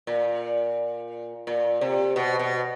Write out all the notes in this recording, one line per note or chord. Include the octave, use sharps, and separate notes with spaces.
A#2
A#2
C3
B2
B2